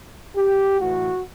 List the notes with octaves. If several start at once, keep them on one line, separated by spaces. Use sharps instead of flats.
G4
A2 E3 F#4